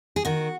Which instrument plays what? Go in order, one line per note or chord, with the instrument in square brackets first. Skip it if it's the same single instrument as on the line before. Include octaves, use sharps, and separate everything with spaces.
[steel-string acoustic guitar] G#4
D#3 F#4